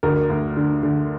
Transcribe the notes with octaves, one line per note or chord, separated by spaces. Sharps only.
D2 A#4
D2
D3
D3